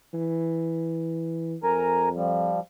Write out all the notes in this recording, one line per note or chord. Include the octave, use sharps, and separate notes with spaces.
E3
F2 A#4 G#5 A#5
F3 G3